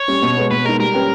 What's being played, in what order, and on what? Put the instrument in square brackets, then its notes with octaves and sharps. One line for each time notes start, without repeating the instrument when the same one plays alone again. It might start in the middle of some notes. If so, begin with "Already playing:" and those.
Already playing: [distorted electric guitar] C#5
[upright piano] G3 C#4
B2
G#3 B3
[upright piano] B2 [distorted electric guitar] B4
[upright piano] G#3 D#4 [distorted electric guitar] A#4
[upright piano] G3 [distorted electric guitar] A#4
[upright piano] C#4 G4 B4